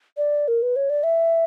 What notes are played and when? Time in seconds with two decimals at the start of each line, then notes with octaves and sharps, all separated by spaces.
0.17 D5
0.48 A#4
0.62 B4
0.76 C#5
0.90 D5
1.03 E5